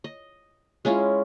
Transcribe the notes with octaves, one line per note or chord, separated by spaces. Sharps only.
D#5
G#3 C#4 E4 F4